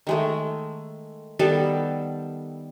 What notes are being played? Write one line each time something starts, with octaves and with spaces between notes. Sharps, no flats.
D#3 G#3 A3
D#3 G3 B3 A4